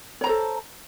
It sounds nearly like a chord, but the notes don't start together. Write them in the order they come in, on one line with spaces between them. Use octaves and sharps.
C#5 A#5 C5 A4